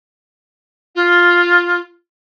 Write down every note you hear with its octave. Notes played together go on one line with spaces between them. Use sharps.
F4